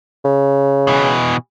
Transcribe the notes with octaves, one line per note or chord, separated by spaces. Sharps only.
C#3
B2 E3